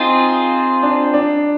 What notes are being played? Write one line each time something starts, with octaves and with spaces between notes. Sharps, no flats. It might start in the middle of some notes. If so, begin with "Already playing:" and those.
Already playing: C4 D#4 F4 G#4
D4
D4